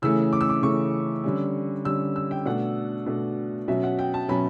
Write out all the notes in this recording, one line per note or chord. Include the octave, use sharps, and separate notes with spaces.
C#3 E3 A3 C#4 E6
D6
E6
D6
C#3 E3 A3 C#4 C#6
D3 G3 C#4
D3 G3 C#4 E6
E6
G5
B2 A3 D4 F#5
B2 A3 D4
B2 F#3 C#4 E5
F#5
G5
A5
B2 F#3 C#4 B5